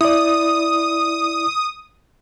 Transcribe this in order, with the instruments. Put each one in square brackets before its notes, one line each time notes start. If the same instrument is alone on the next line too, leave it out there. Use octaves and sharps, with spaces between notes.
[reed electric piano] E4 D5 [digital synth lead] D#6